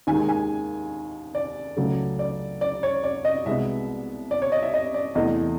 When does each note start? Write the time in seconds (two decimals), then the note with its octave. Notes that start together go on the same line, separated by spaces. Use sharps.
0.07 D#2 D#3 G#3 G#5
0.29 G#5
1.35 D5
1.77 C#2 C#3 F#3 A3
2.19 D5
2.61 D5
2.83 C#5
3.04 D5
3.25 D#5
3.46 C2 B2 G#3 B3 E5
4.31 D5
4.42 C#5
4.52 D#5
4.62 E5
4.74 D#5
4.94 D5
5.15 E2 C3 E3 A3 D#5